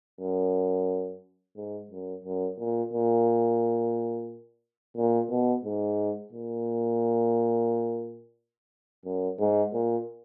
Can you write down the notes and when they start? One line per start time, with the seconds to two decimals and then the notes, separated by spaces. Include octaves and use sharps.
0.21 F#2
1.56 G#2
1.91 F#2
2.25 F#2
2.59 A#2
2.93 A#2
4.97 A#2
5.31 B2
5.65 G#2
6.32 A#2
9.05 F#2
9.39 G#2
9.73 A#2